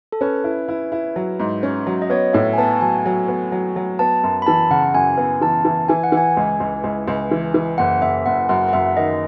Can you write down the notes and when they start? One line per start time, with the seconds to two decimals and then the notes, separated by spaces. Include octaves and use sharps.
0.12 A4
0.21 C#4 B4
0.44 E4
0.69 E4
0.92 E4
1.16 F#3
1.40 G#2
1.63 C#4
1.87 F#3
2.02 D#5
2.10 B3 C#5
2.33 A2 E5
2.53 G#5
2.58 B3 A5
2.81 F#3 G#5
3.06 F#3
3.28 B3
3.52 F#3
3.76 F#3
3.99 B3 A5
4.24 F#2
4.42 B5
4.46 E3 A5
4.70 C#3 F#5
4.94 F#2 G#5
5.17 B3
5.41 E3 A5
5.65 E3
5.88 E3 G#5
6.04 F#5
6.12 E3
6.17 G#5
6.37 C#2
6.60 C#2
6.84 C#2
7.08 C#2
7.31 E3
7.54 E3
7.78 F#1 F#5
8.02 F#1 E5
8.26 F#1 F#5
8.49 F#2 F#5
8.68 F#5
8.73 F#2 E5
8.97 D#3 D#5